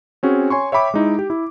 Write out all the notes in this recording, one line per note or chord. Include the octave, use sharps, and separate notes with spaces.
C4 C#4 F#4 G#4
C#5 G#5 C6 C#6
C#5 E5 G5 B5 D6
G#3 D#4 E4
G4
E4